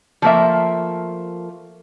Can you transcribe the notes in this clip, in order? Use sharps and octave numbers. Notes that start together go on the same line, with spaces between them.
F3 A3 A#3 E5